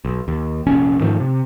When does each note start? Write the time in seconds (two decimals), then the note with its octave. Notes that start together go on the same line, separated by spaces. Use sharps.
0.05 B1
0.28 D#2
0.67 F1 A#1 C#4
1.00 G#2 D#3 F3 A3
1.20 C3